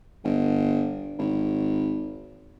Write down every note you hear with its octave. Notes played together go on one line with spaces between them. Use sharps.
G1
G#1